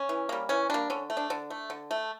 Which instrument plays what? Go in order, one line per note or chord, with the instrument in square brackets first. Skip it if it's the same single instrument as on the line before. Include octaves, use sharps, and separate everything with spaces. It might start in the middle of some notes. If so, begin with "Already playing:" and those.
Already playing: [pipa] C#4
E3
G3 A#3
E3 C#4
G3 A#3 D4
D3 C#4
A3
D4
D3 D4
A3
D3
A3